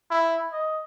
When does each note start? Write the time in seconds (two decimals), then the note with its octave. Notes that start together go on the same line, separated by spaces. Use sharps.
0.11 E4
0.52 D#5